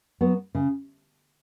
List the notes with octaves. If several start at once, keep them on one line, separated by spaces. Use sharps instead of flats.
F#3 B3 F#4
C#3